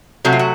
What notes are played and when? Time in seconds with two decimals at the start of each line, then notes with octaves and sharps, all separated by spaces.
0.25 C3 F#3 A3 F#4
0.33 F4
0.39 F#4